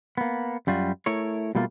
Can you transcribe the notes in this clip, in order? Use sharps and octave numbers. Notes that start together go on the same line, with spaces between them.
A#3 B3
F#2 G3 F4 F#4
A3 E4 A#4 C#5
B2 G3 A3 A#3 F4